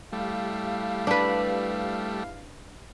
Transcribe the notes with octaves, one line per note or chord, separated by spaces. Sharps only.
G3 A3 E4 G4 F5
D4 B4